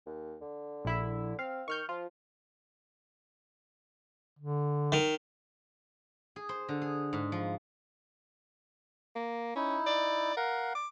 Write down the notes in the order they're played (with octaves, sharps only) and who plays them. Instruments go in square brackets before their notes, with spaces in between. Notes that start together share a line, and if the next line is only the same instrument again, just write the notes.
[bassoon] D#2
D3
[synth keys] A#1 E4 E5
[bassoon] C4 [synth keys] F5
[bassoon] D#3 [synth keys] C#6 F6 G6
[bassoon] F3 [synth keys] F4
[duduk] D3
[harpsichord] D#3
[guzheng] G#4
C5
D3
G#4
G#2
F3
[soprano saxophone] A#3
[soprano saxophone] C#4 [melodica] D#4 E4
[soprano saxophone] D5
[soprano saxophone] A#4 [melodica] F5 F#5
[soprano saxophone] D6